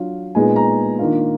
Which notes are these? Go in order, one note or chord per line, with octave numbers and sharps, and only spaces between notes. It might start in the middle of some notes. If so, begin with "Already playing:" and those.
Already playing: F#3 D4 F4
A#2 G#3 B3 D#4 G#5
A#5
D#3 A#3 D4 F4